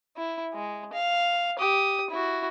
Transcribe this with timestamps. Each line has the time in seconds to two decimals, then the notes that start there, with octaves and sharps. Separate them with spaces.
0.17 E4
0.53 G#3
0.93 F5
1.59 G4 D#6
2.10 E4 F#4